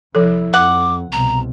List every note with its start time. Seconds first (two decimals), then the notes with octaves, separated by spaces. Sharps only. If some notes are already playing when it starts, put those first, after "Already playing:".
0.15 C2 F3 E4 A4
0.54 F2 F#5 D6
1.12 C2 B2 A#5